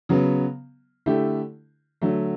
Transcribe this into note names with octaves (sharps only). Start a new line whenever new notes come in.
C#3 F#3 B3
D3 A3 E4 G4
D3 F#3 A3